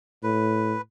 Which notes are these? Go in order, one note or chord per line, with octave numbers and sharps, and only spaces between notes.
A2 B4